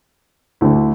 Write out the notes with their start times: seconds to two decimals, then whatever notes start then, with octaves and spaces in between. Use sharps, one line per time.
0.61 D2 D3 A3 E4